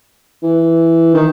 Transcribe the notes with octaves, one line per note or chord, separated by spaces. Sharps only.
E3
D#3